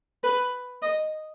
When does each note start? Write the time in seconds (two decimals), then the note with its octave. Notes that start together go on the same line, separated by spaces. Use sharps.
0.24 B4
0.82 D#5